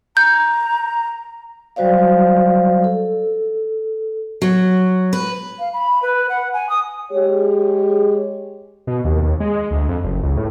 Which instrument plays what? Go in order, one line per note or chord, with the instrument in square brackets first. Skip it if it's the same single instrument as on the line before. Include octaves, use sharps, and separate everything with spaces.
[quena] A#5 [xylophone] G6
[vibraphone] F#3 G3 F#4 C5 D5 F5
A4
[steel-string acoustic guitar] F#3
B4
[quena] F5
B5
B4
F#5
G#5
D#6
[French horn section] G#3 G4 G#4 C#5
[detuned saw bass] B2
D#2
D#2
G#3
G#3
D2
F2
F#1
C#2
A2